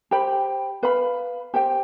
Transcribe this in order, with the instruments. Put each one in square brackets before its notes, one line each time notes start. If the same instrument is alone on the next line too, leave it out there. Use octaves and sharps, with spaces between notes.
[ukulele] G4 C5 G5 B5
B4 F5 B5
G4 C5 G5